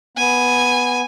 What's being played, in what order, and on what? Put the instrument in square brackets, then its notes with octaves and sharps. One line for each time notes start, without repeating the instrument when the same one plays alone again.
[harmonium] B3 [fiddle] G#5